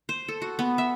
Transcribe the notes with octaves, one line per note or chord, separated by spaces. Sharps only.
C5
A4
F#4
B3
E5